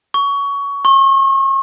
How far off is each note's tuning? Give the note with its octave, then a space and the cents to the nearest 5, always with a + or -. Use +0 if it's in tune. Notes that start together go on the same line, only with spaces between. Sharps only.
C#6 +20
C#6 -40